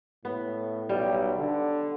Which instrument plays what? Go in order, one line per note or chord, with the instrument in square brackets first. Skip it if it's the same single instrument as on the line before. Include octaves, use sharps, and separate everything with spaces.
[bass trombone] A2 [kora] B3
[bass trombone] B1 [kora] G3
[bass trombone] D3